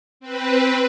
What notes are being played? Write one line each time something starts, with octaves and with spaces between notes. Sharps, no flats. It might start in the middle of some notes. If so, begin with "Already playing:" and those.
C4 B4